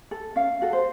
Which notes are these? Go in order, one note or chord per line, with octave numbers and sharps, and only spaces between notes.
A4
C#4 F5
F#4 A4
C5